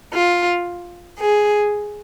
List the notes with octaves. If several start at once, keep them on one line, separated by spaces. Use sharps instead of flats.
F4
G#4